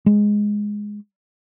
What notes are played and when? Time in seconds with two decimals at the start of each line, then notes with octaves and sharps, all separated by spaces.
0.06 G#3